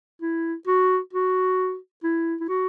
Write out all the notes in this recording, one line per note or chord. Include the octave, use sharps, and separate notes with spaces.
E4
F#4
F#4
E4
E4
F#4